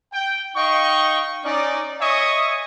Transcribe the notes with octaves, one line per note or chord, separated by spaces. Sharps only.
G5
D#4 D#5 F5 G5 C#6
C#4 D#4 D5
C#5 D#5 E5 G#5 C#6 D#6